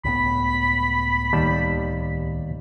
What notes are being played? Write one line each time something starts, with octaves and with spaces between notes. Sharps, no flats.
C#2 A2 B3 B5
D#2 G3 A5